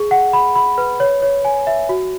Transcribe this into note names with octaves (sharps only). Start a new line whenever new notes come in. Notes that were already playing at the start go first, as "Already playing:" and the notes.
Already playing: G#4
F#5
B5
B5
B4
C#5
C#5
G#5
E5
F#4